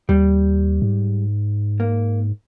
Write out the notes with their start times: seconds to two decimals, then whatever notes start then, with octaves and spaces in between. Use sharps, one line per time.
0.09 D#2 G3
0.82 G#2
1.80 A#3